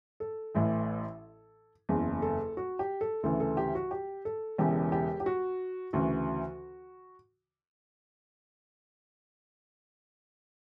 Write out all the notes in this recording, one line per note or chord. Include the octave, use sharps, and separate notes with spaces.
A4
A1 A2 E3
F#1 E2 C#3
A4
F#4
G4
A4
D2 C#3 E3 A4
A4
G4
F#4
G4
A4
E1 E2 C#3 E3 G4
G4
G4
F#4
D2 C#3 E3 F#4